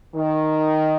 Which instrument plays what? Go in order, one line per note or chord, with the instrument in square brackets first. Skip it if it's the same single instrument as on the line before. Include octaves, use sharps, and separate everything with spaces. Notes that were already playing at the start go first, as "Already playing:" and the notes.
[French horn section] D#3